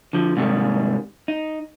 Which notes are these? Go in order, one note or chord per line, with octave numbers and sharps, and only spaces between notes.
D3 F3
G#2 C3 D#3 G3
D#4